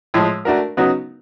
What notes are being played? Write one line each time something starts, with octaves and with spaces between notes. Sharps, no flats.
A2 F3 G#3
A3 D4 F#4 A#4
C#3 F#3 B3 D#4 F#4